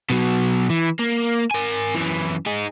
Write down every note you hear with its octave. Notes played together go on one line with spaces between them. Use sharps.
B2 F#3
E3
A#3
A#4 G#5
F#2 E3
D#4 G#4